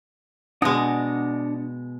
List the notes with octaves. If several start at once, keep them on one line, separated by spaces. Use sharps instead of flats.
B2 G#3 D4 F#5 D#6